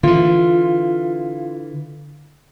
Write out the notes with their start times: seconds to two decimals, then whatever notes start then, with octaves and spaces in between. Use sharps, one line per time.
0.03 D3 E3 F4